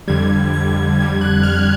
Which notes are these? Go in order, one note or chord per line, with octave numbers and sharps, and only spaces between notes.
F2 D3 G3 G#6
G#6
F2 D3 G3 G#6
F#6
F6